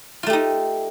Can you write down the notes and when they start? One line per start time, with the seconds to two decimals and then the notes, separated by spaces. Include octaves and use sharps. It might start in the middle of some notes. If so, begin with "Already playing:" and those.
0.23 F4
0.26 A3
0.30 G4
0.33 D#4